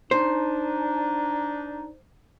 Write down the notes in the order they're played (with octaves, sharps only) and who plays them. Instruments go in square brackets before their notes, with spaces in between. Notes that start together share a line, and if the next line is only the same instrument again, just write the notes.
[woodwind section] D4 D#4 [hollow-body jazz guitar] C5